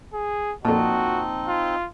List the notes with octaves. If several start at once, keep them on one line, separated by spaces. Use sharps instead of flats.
G#4
F2 A#2 C4 D#4 F#4 D#5 A5
F4